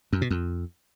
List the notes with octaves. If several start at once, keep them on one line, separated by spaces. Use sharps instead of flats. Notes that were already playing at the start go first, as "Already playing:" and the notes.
F#2
B2
F2